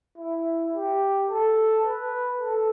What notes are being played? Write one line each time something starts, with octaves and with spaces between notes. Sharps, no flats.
E4
G4
A4
B4
A4